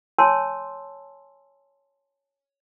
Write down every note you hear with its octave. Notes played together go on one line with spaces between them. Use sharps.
C#5 G#5 A5 C6 E6